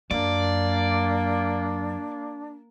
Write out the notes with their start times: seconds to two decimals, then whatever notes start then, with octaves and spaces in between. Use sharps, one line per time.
0.11 F#2 A#3 D4 D5